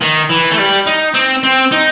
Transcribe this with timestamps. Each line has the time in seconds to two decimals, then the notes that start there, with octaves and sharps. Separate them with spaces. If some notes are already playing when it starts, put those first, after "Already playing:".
0.01 D#3
0.29 E3
0.51 A3
0.58 G3
0.87 D#4
1.15 C4
1.44 C4
1.72 D#4